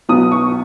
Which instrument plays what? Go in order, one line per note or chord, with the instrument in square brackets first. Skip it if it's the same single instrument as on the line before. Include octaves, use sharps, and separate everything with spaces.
[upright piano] B1 B2 F#3 B3 D#6
C#6